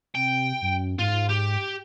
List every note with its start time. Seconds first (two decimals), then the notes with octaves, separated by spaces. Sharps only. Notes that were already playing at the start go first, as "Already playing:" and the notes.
0.15 C3 G5
0.61 F#2
0.99 G#2 F4
1.29 G4